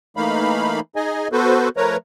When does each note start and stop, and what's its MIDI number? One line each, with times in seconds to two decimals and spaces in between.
0.17 0.80 52
0.17 0.80 57
0.17 0.80 58
0.17 0.80 63
0.17 0.80 77
0.17 0.80 83
0.96 1.28 63
0.96 1.28 68
0.96 1.28 75
0.96 1.28 80
1.32 1.69 59
1.32 1.69 66
1.32 1.69 69
1.32 1.69 71
1.32 1.69 72
1.77 1.97 53
1.77 1.97 57
1.77 1.97 70
1.77 1.97 71
1.77 1.97 73
1.77 1.97 82